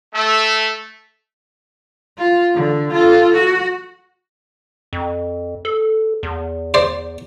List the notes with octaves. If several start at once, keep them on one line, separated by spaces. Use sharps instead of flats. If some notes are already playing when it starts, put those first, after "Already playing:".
A3
F4
D3
F4 A4
F#4
F2
A4
E2
C5 D5